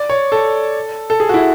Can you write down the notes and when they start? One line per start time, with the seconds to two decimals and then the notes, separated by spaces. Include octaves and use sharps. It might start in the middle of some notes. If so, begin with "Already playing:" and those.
Already playing: D5
0.10 C#5
0.32 A4
1.10 A4
1.20 G#4
1.29 F#4
1.34 E4